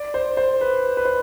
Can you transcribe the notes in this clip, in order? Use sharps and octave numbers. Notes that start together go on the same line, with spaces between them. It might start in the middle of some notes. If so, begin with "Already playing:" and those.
Already playing: D5
C5
C5
B4
B4
C5